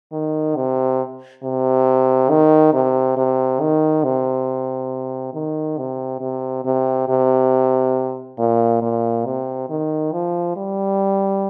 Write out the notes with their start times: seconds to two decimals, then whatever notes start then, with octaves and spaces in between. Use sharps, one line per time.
0.12 D#3
0.56 C3
1.43 C3
2.30 D#3
2.73 C3
3.17 C3
3.61 D#3
4.04 C3
5.34 D#3
5.78 C3
6.21 C3
6.65 C3
7.08 C3
8.38 A#2
8.82 A#2
9.26 C3
9.70 D#3
10.12 F3
10.56 G3